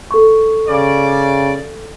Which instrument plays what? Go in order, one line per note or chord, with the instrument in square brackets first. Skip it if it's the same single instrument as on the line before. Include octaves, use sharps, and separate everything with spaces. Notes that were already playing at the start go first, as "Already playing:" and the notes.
[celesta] A4 C#6
[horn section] C#3 D5